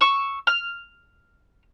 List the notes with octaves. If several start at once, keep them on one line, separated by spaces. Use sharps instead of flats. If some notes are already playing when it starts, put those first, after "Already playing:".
C#6 E6
F6